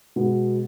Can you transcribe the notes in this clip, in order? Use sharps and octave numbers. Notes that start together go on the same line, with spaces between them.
B2 G#3 B3